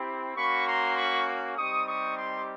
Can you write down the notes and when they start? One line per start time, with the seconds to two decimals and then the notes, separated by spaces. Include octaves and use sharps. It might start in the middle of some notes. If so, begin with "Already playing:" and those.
Already playing: C4 E4 G4
0.36 A#3 C#4 F#4 B5 C#6
0.67 A#5 C6
0.96 B5 C#6
1.56 G3 C4 D#4 G4 C#6 D#6
1.86 C#6 D#6
2.16 C6 D6